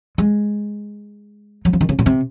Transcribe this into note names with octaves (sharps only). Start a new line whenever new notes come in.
G#3
F#3
F3
D#3
C#3
A#2
C3